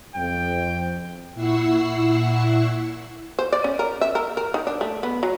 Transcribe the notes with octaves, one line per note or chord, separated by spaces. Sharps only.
F2 G5
A#2 E4 F#5 C#6 E6 C7
C5
D5
C#4
A#4
E5
A#4
A#4
D#3
D4
A3
B3
F#3